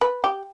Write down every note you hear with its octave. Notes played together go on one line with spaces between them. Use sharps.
B4
G4